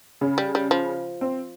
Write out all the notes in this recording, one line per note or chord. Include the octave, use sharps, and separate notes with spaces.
C#3 C#4
G3
G3
F3
C4